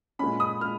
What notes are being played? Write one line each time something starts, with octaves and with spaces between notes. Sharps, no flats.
A#2 G#3 C#4 B5
D#6
A#2 G#3 F6